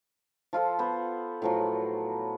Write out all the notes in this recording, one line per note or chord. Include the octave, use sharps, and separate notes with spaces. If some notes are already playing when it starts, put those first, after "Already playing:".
F3 F4 A4 C5
B3 C5
A2 F3 F#3